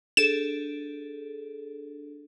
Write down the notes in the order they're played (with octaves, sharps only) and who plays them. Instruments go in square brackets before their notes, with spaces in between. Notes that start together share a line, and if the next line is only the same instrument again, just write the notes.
[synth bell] D4 G#4 A4 [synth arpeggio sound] E7